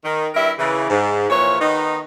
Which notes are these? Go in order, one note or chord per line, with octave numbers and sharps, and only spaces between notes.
D#3
G2 G3 E4 A#4 E5
C#3 E3
G#2
A#2 E3 F3 C#5
D#3 B3 D#4